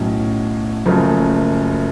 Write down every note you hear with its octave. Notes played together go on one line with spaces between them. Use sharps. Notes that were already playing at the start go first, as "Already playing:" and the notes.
Already playing: B1 A2 F#3 C#4
F#1 F#2 C#3 F3 A3